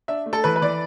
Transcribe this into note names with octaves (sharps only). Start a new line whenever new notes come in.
D4 E5
A3
A4
E3 B4
B4
E3 D5